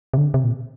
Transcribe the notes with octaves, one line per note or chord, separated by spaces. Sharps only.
C3
D3
C3
A#2